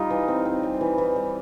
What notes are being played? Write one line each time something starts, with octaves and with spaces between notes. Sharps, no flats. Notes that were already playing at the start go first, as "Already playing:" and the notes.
Already playing: G3 D#4 F4
E3
C4
C4
G3
E3
E3
G3